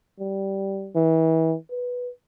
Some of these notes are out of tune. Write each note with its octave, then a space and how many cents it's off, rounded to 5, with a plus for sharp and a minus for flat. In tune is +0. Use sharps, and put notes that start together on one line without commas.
G3 -10
E3 -30
B4 -5